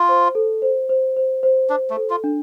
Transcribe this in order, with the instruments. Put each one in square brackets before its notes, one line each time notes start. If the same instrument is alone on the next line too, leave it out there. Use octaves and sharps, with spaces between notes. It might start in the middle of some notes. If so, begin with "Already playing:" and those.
Already playing: [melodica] F4
[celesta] C5
A4
C5
C5
C5
C5
[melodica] D4 [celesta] C5
[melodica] A3
[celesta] A4
[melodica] F4
[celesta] D4